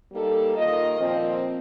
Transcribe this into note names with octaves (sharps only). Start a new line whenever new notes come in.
G3 A#3 D#4 A4
D#3 A#3 F4 A#4 D#5
A#2 F3 C4